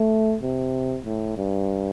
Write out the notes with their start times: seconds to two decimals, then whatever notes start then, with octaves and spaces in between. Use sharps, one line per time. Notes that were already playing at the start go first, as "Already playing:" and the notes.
Already playing: A3
0.42 C3
1.05 A2
1.37 G2